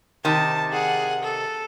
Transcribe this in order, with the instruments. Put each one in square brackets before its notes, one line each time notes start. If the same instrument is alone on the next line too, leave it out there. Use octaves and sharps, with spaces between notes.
[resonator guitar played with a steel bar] C3 D#3 [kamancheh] A5
[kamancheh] G#4 F#5
A4